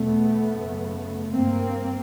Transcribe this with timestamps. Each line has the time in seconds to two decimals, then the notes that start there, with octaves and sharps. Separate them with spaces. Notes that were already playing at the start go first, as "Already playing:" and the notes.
Already playing: E2 B2 A3 B3
0.49 F#2 C#3
1.30 G2 A#3 C4